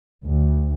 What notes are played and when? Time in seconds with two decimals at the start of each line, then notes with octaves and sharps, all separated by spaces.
0.25 D2